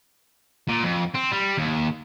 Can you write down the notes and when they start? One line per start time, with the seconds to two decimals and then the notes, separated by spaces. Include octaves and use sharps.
0.69 A#2
0.83 F2
1.15 C4
1.32 G3
1.58 D#2